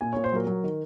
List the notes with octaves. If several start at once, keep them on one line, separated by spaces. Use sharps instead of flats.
A#2 G#5
A#2 C#5
C5
F#3 A#4
F#3
D#3